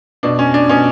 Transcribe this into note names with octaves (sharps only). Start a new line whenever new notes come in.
B2 D4
C#4
D4
B2 C#4